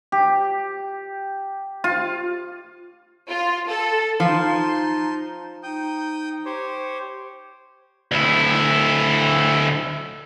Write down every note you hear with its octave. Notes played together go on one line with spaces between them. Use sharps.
G4
F4
F4
A4
F3 D#4 A5 C6 G6
D#4 G5 D#6 G6
G4 C5 C#5
D2 E4